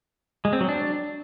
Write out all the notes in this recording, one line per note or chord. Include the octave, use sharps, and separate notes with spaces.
G#3
C4
F#3
D4